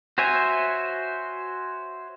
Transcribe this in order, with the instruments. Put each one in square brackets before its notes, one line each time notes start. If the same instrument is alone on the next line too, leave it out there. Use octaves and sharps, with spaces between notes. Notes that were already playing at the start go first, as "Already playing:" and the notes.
[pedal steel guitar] F#4 C5 C#5 E5 G#5